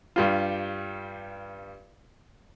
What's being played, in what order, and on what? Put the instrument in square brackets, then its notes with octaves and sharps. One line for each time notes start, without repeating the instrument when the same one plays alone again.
[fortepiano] G2 G3 F4